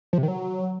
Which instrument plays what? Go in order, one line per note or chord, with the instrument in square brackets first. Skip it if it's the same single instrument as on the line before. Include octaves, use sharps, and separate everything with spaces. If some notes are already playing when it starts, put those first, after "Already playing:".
[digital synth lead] F3
C3
D#3
F#3